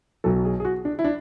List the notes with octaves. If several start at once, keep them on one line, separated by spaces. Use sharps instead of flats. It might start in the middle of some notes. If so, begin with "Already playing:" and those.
B1 B2 F#3 A4
G#4
G#4
F#4
D4
E4
D4